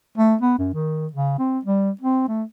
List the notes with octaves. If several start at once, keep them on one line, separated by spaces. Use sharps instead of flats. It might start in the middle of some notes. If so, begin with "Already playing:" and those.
A3
B3
F#2
D#3
C#3
C4
G3
C4
A3